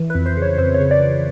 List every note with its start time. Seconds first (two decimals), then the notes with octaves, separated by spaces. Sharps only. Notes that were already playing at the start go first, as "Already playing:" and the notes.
Already playing: E3
0.10 B4
0.15 F2
0.26 C5
0.37 C#3
0.42 C#5
0.58 F2 C5
0.74 C#5
0.80 C#3
0.91 D5
1.02 C#3